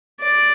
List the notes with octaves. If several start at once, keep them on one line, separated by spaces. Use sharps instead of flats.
D5